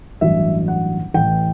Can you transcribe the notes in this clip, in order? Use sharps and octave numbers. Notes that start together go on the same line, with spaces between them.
A1 G2 F#3 E5
F#5
A1 A2 E3 G5